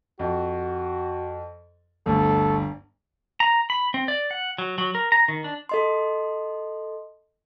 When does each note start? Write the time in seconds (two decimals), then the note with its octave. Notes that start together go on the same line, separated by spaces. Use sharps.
0.19 F2 F#4
2.06 G1 D2 A4
3.40 A#5
3.70 B5
3.94 C4
4.08 D5
4.31 F#5
4.58 F#3
4.78 F#3
4.95 A#4
5.12 A#5
5.28 D#3
5.44 D4
5.69 A4 D#5 C6